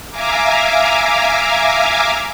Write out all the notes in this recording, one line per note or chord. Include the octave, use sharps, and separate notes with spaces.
E5 F5 G#5 A#5 D6